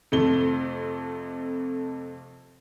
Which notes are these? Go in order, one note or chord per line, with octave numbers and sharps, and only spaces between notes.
F2 C3 A3 G7